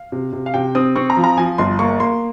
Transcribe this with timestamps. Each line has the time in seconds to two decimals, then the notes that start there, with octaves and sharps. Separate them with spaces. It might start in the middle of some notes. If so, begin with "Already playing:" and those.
Already playing: F5
0.12 C3
0.33 C3
0.46 F5
0.54 C3 G5
0.75 C4 D#6
0.96 C4 C#6
1.10 A#5
1.17 F3
1.24 A#5
1.37 F3 G#5
1.58 G1 C6
1.79 A#3 C#6
2.00 A#3 C6